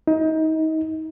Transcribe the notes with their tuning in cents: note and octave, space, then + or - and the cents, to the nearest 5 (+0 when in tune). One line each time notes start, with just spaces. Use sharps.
D#4 +30